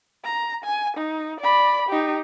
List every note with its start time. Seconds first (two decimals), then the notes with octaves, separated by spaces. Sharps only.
0.24 A#5
0.64 G#5
0.97 D#4
1.41 D5 B5
1.89 D#4 G4